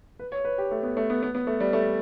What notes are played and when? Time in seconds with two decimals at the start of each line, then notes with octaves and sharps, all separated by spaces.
0.19 B4
0.32 C#5
0.45 B4
0.58 G4
0.71 A3
0.83 B3
0.97 A3
1.10 B3
1.23 B3
1.35 B3
1.47 A3
1.60 G3
1.73 A3